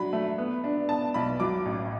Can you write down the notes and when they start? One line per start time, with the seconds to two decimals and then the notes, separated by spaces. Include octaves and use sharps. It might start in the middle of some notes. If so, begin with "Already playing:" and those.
Already playing: F#3 D4 B5
0.13 A3
0.38 B3
0.64 D4
0.89 B3 A5
1.14 B1 B5
1.40 F#3 D6
1.65 A1